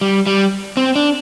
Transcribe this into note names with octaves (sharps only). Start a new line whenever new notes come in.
G3
G3
C4
D4